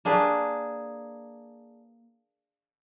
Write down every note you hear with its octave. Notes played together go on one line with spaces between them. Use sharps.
A#3 D4 G#4 B4